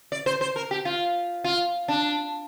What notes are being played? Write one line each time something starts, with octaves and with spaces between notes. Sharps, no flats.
D5
C5
C5
A#4
G4
F4
F4
D4